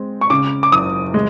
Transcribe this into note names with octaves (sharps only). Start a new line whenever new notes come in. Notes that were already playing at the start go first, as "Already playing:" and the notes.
Already playing: G#3 C4
C#6
C#3 D6
D6
F#1 D#6
G#3